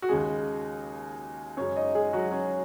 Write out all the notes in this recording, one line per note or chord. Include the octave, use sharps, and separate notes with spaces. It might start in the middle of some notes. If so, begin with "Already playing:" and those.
F#4
D#2 C#3 G#3 G#4
F#2 C#3 G#3 C#4 C#5
D#4 D#5
G#3 G#4
F#3 F#4
C#4